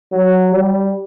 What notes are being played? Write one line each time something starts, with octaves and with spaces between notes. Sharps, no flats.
F#3
G3